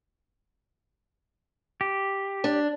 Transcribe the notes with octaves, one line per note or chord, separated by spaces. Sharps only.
G4
D4